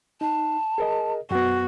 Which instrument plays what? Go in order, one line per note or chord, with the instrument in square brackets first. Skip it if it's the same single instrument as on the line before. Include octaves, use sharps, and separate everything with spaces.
[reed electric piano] D#4 [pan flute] A5
[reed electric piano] G#4 A#4 D#5
[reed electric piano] F#2 B3 [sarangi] F#4